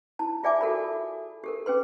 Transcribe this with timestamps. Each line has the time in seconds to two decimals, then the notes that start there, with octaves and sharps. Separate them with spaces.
0.19 E4 A5
0.43 F4 G#4 D5 E5 G#5 D6
0.61 F#4 A4 A#4 B5
1.44 G4 A4 A#4
1.66 C#4 G#4 B4 C6